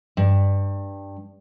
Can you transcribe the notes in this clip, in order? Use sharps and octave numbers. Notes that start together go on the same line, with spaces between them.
G2